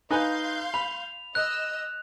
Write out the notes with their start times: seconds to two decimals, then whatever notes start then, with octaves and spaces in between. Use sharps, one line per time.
0.11 D#4 B4 F5 G#5 C6 G6
0.74 B5 F7
1.35 D#5 E6 F#6